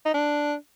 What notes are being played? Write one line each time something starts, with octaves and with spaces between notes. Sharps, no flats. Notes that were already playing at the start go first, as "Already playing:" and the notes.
D#4
D4